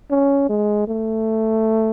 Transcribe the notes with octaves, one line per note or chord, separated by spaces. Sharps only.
C#4
G#3
A3